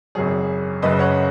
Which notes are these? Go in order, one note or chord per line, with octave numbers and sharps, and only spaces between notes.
G#1 F#2 C#3 F#3 G#4 C#5
F#1 F#2 C#3 B4 D#5
C#5 F#5